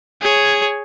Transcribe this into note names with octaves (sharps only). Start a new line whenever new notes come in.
G#4 C#5